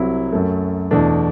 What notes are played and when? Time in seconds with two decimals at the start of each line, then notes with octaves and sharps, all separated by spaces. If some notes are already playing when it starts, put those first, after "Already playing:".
Already playing: C2 C3 F#3 C4 E4
0.32 F#2 F#3 A3
0.91 E2 B2 A3 D4